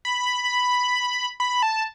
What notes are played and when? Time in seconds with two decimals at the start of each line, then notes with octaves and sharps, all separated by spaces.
0.05 B5
1.40 B5
1.63 A5